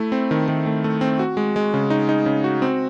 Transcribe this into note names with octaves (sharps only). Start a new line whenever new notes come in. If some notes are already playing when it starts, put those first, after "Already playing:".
Already playing: A3 E4
C4
D#3
D#3
A3
A3
C4
F#4
G#3
G#3
C#3
D#4
D#4
C#3
F#4
C4